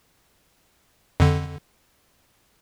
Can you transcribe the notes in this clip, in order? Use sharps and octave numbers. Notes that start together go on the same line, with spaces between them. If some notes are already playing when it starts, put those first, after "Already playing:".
F2 D3